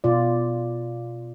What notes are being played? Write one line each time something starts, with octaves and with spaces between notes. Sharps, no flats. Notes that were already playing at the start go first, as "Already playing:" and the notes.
B2 F4 D5